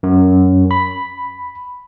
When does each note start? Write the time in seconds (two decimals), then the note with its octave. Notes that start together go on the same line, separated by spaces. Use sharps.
0.03 F#2
0.71 B5